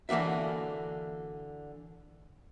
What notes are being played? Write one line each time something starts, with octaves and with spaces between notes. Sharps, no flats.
D3 E3 A#3 F#4 E5